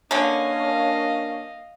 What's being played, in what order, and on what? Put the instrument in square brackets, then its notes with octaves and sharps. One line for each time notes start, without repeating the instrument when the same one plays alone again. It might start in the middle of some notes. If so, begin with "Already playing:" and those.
[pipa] D3 C#4 [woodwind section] A#3 D4 [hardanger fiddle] D#5 F5